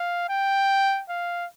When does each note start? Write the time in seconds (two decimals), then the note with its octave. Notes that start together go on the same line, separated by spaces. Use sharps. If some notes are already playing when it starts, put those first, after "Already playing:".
Already playing: F5
0.29 G5
1.09 F5